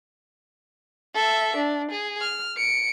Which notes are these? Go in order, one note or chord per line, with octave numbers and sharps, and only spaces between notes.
A4 E5
D4
G#4
F6
C#7 D7